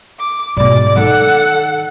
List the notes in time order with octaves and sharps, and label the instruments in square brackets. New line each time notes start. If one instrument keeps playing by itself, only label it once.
[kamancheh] D6
[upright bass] G#2 B2 [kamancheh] D5
[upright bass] D#3 [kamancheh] A4 F#5